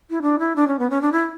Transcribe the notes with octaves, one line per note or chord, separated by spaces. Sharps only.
E4
D4
E4
D4
C#4
B3
C#4
D4
E4